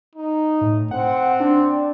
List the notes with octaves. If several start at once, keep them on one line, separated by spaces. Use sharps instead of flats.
D#4
A2
C4 F#5
D4